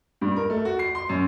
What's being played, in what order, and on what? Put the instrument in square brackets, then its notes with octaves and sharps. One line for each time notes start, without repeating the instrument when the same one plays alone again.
[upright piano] G2
A#4
A3
F#4
C7
C6
F#2